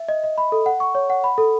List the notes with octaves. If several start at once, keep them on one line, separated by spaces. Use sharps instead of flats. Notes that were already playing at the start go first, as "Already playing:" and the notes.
Already playing: E5
D#5
D#5
B5
A4
F#5
C#6
C#5
F#5
B5
A4